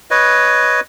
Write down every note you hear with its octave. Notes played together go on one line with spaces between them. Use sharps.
B4 C#5 D#5